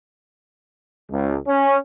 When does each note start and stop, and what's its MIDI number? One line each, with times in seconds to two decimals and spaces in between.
1.11 1.37 37
1.46 1.76 61